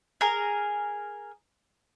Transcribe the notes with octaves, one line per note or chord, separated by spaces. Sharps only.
G#4 A#4